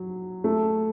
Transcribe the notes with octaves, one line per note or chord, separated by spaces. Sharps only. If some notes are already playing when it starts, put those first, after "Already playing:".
Already playing: F#3
A3